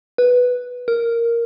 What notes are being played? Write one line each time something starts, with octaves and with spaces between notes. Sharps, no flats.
B4
A#4